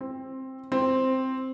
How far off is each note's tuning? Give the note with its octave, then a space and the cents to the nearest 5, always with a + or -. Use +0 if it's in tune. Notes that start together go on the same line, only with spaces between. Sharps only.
C4 +10
C4 +0